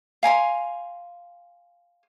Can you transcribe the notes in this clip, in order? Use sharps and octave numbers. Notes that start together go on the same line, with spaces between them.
F5 G#5 A#5 C6